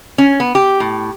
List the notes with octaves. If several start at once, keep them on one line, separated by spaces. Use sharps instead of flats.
C#4
B3
G4
A2